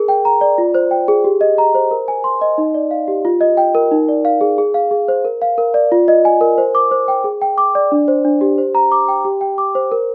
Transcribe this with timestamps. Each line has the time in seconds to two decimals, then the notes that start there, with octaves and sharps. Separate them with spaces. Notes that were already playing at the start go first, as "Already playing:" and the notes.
Already playing: G#4 A#4
0.08 G5
0.25 A#5
0.41 D5
0.58 F4
0.75 C5
0.91 G5
1.08 G#4
1.24 G4
1.41 D#5
1.58 A#5
1.75 C5
1.91 A#4
2.08 G#5
2.24 C6
2.41 D#5
2.58 D#4
2.74 D5
2.91 F5
3.08 G4
3.25 F4
3.41 D#5
3.57 G5
3.75 A#4
3.92 D#4
4.08 D5
4.25 F5
4.41 G#4
4.58 G#4
4.74 F5
4.91 G#4
5.08 C5
5.24 A#4
5.42 F5
5.58 A#4
5.74 D5
5.92 F4
6.08 D#5
6.25 G#5
6.41 A#4
6.58 C5
6.75 D6
6.91 C5
7.08 G5
7.24 G#4
7.42 G5
7.58 D6
7.75 D5
7.92 D4
8.08 C5
8.25 D4
8.41 G4
8.58 C5
8.75 A#5
8.92 D6
9.08 G5
9.25 G4
9.41 G5
9.58 D6
9.75 C5
9.92 A#4